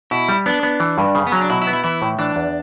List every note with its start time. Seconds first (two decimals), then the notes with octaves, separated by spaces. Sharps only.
0.11 B2 E4
0.28 G3
0.46 B3 D4
0.63 B3
0.80 E3
0.98 G2
1.15 C#3
1.27 B3
1.32 F#3 C#4
1.41 D4
1.50 B2 E4
1.62 E4
1.67 B3
1.73 E4
1.84 E3 E4
2.02 A2
2.19 E3 D4
2.36 E2